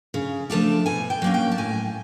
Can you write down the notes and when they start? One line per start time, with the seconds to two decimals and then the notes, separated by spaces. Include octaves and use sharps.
0.14 C#3
0.50 F3 A3 D4 A5
0.86 B2 G#5
1.10 G5
1.22 F#3 A#3 C#4
1.34 G5
1.52 A5
1.58 A2 G#5